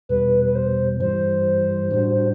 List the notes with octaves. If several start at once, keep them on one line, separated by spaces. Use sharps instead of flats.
E2 B2 G3 B4
B4
C5
G2 E3 G3 C5
A2 G3 D4 F#4